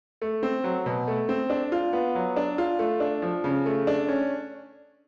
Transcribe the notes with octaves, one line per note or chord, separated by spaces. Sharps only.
A3
C4
F#3
B2
A3
C4
D4
F4
B3
F#3
D4
F4
A3
D4
F3
C#3
A3
D4
C#4